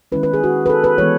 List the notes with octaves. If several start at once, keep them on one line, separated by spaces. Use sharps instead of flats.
D#3 G#3 C#4 E4 B4
B4
G#4
F#4
B4
A4
B4
E3 G#3 B3 C#5